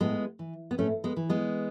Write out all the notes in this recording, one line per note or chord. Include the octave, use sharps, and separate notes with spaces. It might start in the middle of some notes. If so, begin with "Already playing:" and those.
A2 G#3 B3
E3
B3
A2 A3 C#4
G#3 B3
E3
G#3 B3